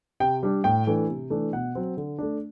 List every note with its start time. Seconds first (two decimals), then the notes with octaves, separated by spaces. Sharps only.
0.20 C3 G5
0.43 G3 D4
0.64 A2 G5
0.87 E3 A3 D4
1.09 C3
1.30 E3 A3 D4
1.52 B2 F#5
1.75 F#3 C4
1.97 D3
2.18 A3 D4